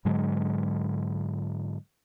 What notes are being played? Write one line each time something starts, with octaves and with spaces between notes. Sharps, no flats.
G#2 D3 F#3 G#3